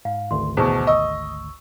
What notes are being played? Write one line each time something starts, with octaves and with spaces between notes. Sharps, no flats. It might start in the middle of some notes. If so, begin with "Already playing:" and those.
G#2 F5
G#1 D2 C6
E2 B2 C5 A5 C#6
D#5 C#6 E6